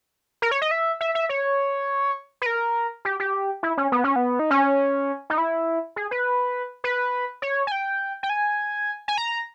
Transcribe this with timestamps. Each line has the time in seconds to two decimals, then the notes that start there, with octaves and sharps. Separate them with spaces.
0.42 A#4
0.51 C#5
0.62 D#5
0.71 E5
1.01 E5
1.15 E5
1.29 C#5
2.42 B4
2.46 A#4
3.05 G4
3.20 G4
3.63 E4
3.77 C#4
3.92 B3
4.04 C#4
4.16 B3
4.39 D#4
4.51 C#4
5.30 D#4
5.38 E4
5.96 G#4
6.11 B4
6.84 B4
7.42 C#5
7.67 G#5
7.72 G5
8.23 G5
8.30 G#5
9.08 G#5
9.18 A#5